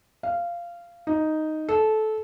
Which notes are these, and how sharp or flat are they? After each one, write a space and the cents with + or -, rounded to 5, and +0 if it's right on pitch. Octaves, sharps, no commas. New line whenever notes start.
F5 -15
D#4 +0
A4 -20